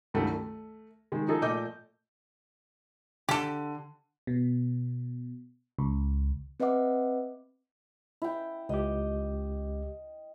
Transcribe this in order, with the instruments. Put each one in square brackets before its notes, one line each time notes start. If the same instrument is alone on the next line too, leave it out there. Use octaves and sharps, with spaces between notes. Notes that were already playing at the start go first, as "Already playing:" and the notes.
[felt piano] C#2 G2 D#3 F#3 G3 A3
A3
D#3 G#3
F3 D#4 G#4 A4
A#2 A3 D#5 D6 G6
[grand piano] D3 [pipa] G4 A4
[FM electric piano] B2
C#2
[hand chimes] C4 B4 D#5 E5 F#5 D6
[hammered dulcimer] E4 G5
[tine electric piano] C#2 G4 [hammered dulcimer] D#5